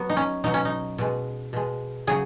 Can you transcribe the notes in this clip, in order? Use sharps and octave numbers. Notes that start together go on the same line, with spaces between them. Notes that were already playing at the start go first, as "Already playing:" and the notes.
Already playing: F#3 B3
D#4
C#4
B2 F#3 D#4
C#4
D#4
B2 G#3
B2 G#3
C#3 F#3 G#4